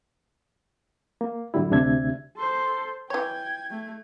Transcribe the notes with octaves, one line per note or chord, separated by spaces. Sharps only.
A#3
F2 A2 D3 F#3 G3 E4
D2 C3 D4 E5 G#6
A4 C5 C6
E3 C#5 G5 G#6
A3 G#6